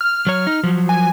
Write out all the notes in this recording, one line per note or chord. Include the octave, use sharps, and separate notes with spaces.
F6
F#3 C#5
D#4
F3 F#3
G#5